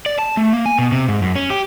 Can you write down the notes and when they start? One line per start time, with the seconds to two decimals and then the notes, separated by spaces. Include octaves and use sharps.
0.06 D5
0.19 A5
0.37 A3
0.53 A#3
0.66 G#5
0.79 B2
0.92 C3
1.08 G#2
1.22 F#2
1.36 C#4
1.50 G4